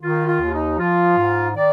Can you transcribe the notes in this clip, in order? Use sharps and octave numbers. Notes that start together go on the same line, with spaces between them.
D#3 F4
F4
D#2
D#4
F3 F4
G#2
D#3 D5